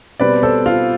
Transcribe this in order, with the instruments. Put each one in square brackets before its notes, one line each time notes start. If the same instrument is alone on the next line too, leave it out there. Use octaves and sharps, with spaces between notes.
[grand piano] B2 G3 C4 B4 D5
A4 C5
F4